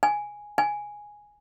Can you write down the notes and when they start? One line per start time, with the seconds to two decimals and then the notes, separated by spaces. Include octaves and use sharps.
0.03 G#5
0.58 G#5